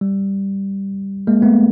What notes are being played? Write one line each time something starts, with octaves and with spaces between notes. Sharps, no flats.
G3
G#3 A#3
A3 B3